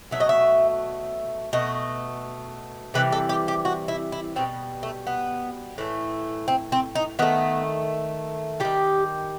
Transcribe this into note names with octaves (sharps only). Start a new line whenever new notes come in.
B2 F#3 A3 E5
D#5
E5
B2 A3 D#5
C3 E3 G3 B4
A4
G4
G4
F#4
E4
E4
B2 G3 C4
A3
B3
A2 E3 A3
C4
C4
D#4
D#3 A3 B3
D#3 G3 G4